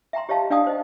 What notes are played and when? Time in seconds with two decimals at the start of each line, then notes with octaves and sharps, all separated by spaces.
0.13 E5 G5 A#5 C6
0.29 G4 C#5 D#5 F5 A5
0.50 D4 D5 F5 G5 A5 D#6
0.67 C5 D#5